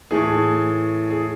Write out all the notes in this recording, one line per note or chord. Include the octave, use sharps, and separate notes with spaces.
A2 E3 A3 G#4
G#4